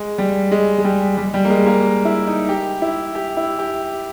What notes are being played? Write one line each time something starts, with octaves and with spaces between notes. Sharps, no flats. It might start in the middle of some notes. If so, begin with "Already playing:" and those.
Already playing: G#3
G3
G#3
G#3
G3
G3
G3
A#3
G#3
A#3
E4
D#4
G4
E4
G4
E4
G4